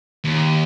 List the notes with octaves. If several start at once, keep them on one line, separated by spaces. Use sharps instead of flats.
D#2